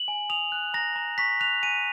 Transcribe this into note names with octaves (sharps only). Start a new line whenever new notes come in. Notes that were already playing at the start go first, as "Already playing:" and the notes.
Already playing: F#7
G#5
D#6 F7
F#6
A#5 A#6
A#5
C#6 B6
F#6 F7
G#5 D#7